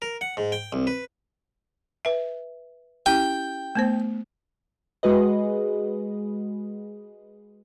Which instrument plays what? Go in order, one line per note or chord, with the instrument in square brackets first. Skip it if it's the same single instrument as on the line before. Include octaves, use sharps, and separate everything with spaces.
[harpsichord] A#4
F#5
G#2
G5
C2
B4
[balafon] B4 E5
[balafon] C#4 E4 G4 [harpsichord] G5
[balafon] A3 B3 C5
[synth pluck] G#3 F#4 G#4 B4 D#5